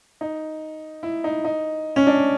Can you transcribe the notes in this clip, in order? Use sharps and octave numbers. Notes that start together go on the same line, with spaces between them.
D#4
E4
D#4
D#4
C#4
D4